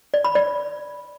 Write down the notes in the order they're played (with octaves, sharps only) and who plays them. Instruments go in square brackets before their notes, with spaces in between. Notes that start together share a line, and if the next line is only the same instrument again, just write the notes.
[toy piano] D5
B5
D5